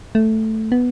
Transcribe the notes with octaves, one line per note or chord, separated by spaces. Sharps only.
A3
B3